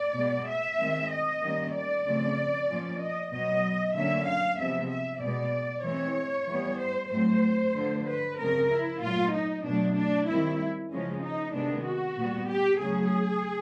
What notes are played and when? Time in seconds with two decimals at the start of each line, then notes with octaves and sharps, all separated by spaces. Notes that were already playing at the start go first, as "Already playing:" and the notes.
Already playing: D5
0.17 B2 G#3 B3
0.49 E5
0.81 D#3 G#3 C4
1.13 D#5
1.43 D#3 G3 A#3 C#4
1.76 D5
2.07 C#3 F3 A3 C4
2.70 A#2 F3 A#3 C#4
3.02 D#5
3.33 B2 F#3 B3 D#5
3.96 D3 F#3 A#3 C#4 E5
4.28 F5
4.59 C3 F3 G#3 B3 E5
4.92 E5
5.22 B2 G#3 B3 D5
5.85 E3 G#3 C4 C#5
6.49 E3 G3 B3
6.81 C5
7.12 A2 F#3 A3 C4 C5
7.76 D3 F3 A3
8.07 B4
8.39 C#3 F3 G#3 C4 A#4
8.70 E4
9.02 A#2 F#3 A3 F4
9.33 D#4
9.65 B2 F#3 A3 D4
9.97 D4
10.28 D#3 G3 C4 E4
10.92 C#3 F3 G#3 C#4
11.23 D#4
11.55 C3 D#3 G#3 B3 D4
11.86 F#4
12.18 A#2 G3 B3
12.49 G4
12.81 C#3 F#3 A3 C#4 G#4